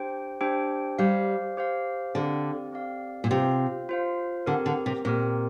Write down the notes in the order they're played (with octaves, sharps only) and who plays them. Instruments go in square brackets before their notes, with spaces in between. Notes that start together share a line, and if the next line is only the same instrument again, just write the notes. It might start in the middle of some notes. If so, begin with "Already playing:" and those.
Already playing: [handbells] D4 G4 C5 G5
D4 G4 C5 G5
[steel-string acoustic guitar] G3 [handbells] G4 C5 F5
[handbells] G4 C5 F5
[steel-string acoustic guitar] D3 [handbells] C4 G4 D5 F5
[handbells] C4 G4 D5 F5
[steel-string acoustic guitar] A#2
[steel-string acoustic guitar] C3 [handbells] F4 C5 F5
[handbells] F4 C5 F5
[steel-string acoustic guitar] D3 [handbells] C4 G4 A#4
[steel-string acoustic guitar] D3
C3
[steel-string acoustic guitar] A#2 [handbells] C4 G4 A#4